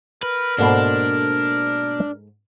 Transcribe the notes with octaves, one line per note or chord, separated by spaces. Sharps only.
A#4 B4
G#2 B2 A#3 D4 A4 C5 F#5